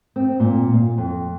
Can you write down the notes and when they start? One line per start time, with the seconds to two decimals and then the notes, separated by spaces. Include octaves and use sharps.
0.16 C4
0.40 A#2
0.74 F5
0.98 F2